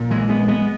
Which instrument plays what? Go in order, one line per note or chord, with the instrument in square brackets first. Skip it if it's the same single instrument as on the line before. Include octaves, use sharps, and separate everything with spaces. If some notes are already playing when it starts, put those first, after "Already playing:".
Already playing: [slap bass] A#1 A#2
E3 G#3
G#3 B3
G#3 B3